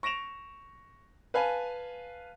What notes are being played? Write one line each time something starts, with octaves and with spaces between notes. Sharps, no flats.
C#6 A#6 D7 E7 F7
B4 F5 G#5 A5